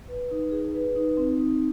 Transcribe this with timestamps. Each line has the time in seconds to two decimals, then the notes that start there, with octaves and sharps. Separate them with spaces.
0.08 B4
0.31 D#4
0.51 G#4
0.74 B4
0.96 D#4
1.17 C4
1.39 D#4